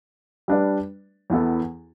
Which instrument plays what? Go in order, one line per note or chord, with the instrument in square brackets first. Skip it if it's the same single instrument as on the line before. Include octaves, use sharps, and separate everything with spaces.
[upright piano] G3 D4 B4 D5
E2 E3 B3 E4 A4